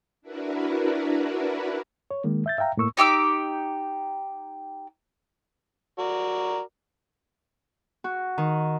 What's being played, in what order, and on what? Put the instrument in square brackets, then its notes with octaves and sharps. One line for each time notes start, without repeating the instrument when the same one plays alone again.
[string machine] D4 E4 F#4 A#4 B4
[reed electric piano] C#5
D#3 G#3 A#3
E5 G6 A6
E5 F5 G5 A#5
A2 A#3 C#6 E6
[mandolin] D#4 G4 D6 E6
[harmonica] F#4 A#4 D5
[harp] F#4
D#3